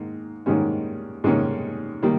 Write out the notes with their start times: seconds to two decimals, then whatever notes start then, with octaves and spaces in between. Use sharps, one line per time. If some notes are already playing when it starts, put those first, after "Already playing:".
Already playing: G#2 D#3 A#3
0.46 G#2 D#3 G3 A#3 C#4
1.24 G#2 D#3 G3 A#3 C#4
2.03 D#3 G3 A#3